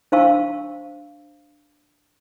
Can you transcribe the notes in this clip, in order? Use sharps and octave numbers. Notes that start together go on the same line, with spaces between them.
D4 C5 F5 A5 C#6 E6